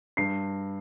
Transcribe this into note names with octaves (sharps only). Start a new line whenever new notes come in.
G2 C7